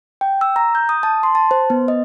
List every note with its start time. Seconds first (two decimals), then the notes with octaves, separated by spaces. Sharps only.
0.21 G5
0.41 E6
0.56 A#5
0.75 G6
0.89 D#6
1.03 A5
1.23 C6
1.35 A5
1.51 C5
1.70 B3
1.88 D#5